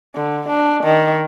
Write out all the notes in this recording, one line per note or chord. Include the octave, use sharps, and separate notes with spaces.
D3
D4
D#3